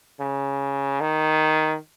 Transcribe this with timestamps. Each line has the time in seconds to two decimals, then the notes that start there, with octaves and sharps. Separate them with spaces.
0.20 C#3
1.01 D#3